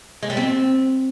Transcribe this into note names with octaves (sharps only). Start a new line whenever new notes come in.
G#3
G3
C4